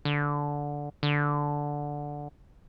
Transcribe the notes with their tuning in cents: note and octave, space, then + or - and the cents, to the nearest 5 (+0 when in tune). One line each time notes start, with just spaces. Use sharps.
D3 -10
D3 -5